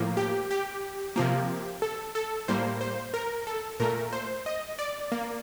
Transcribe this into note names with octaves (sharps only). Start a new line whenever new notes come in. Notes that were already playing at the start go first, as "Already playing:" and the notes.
Already playing: A2 F3 A#3
G4
G4
C3 F3 A#3
A4
A4
A2 G3 A#3 C5
C5
A#4
A4
A#2 A3 A#4
C5
D#5
D5
A#3